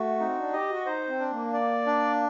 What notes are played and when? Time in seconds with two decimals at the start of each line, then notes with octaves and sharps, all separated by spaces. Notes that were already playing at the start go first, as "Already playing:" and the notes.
Already playing: A3 F#4
0.19 C4 D#4
0.37 D4
0.53 G4 D#5
0.70 F#4
0.86 D#4 C5
1.08 C4
1.20 D4
1.31 A#3
1.53 D5
1.87 D4